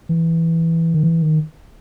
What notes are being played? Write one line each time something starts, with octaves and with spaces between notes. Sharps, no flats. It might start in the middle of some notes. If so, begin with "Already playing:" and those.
E3
D#3
E3
D#3